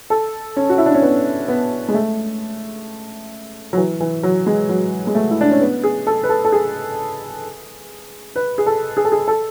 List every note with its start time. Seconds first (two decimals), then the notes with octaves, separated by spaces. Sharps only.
0.10 A4
0.56 C#4
0.69 F#4
0.78 E4
0.86 D4
0.94 C#4
1.02 B3
1.48 B3
1.88 G#3
1.94 A3
3.73 F#3
3.77 E3
4.00 E3
4.23 F#3
4.46 G#3
4.69 F#3
5.07 G#3
5.15 A3
5.30 E4
5.41 D4
5.51 C#4
5.61 B3
5.84 G#4
6.07 A4
6.23 B4
6.29 A4
6.45 A4
6.52 G#4
8.36 B4
8.58 G#4
8.66 A4
8.97 G#4
9.05 A4
9.12 G#4
9.28 A4